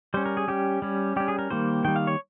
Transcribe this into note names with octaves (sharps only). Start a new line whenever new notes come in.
G3 C#4 C5
A#4
G#4
G3 C#4 G4
G3 C#4
G3 C#4 G4
G#4
A#4
D#3 G3 A#3 C5
D#3 G3 A#3 G5
F5
C#5